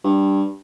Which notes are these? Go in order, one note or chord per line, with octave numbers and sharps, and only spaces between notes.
G2